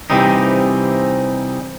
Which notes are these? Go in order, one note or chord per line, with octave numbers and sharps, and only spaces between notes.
C3 E3 G3 C4 D#4